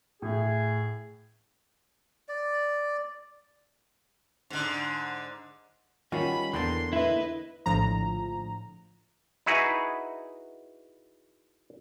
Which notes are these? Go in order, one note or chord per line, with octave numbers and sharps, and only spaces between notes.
A2 G#4
D5
G#2 D3
D#3 G3 C#4 F4 F#4 B5
E2 D3 A#3 G5 A5 C6
E4 B4 D#5
A#1 A2 D3 F3 A#5
D#4 E4 F#4 G#4 B4